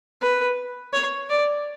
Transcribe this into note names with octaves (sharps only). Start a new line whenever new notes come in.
B4
C#5
D5